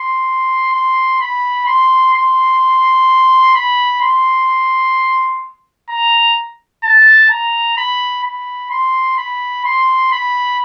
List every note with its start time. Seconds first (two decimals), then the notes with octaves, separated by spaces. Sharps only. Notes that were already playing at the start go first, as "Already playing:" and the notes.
Already playing: C6
0.74 C6
1.21 B5
1.66 C6
2.14 C6
3.55 B5
4.02 C6
5.89 A#5
6.84 A5
7.30 A#5
7.77 B5
8.24 B5
8.71 C6
9.18 B5
9.65 C6
10.12 B5